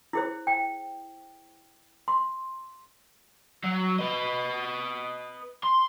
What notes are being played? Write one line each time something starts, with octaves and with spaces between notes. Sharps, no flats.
E4 G#4 C5
G5
C6
F#3
B4 D#5
C6